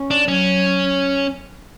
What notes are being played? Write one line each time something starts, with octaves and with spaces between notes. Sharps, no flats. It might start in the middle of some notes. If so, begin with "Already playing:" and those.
Already playing: C#4
D4
F#3 C#4